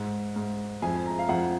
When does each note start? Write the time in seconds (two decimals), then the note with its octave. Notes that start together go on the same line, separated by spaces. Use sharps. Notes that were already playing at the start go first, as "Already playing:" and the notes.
Already playing: G#2
0.36 G#2
0.82 F2 G#5
1.06 A#5
1.19 F5
1.29 F2 F#5